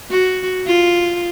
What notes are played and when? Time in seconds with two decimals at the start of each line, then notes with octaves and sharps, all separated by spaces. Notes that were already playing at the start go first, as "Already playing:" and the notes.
0.10 F#4
0.66 F4